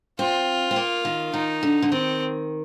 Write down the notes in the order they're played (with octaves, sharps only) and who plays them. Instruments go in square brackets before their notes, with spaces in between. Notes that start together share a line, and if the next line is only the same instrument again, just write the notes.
[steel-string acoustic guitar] C4 [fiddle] F4
[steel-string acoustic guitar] C4
A#3
D#3
[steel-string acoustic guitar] D#3 [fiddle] D#4
[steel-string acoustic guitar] D3
D3
[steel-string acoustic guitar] D#3 [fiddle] C4